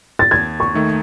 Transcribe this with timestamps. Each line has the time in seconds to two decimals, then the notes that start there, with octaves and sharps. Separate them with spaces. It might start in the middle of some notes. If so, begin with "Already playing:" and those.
0.19 A6
0.31 D#2 G#6
0.60 C#6
0.74 D#3 A3 D#4